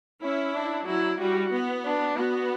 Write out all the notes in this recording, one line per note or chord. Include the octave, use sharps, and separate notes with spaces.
C#4 E4
D4
F#3 E4
G3 F#4
B3
D4
B3 F#4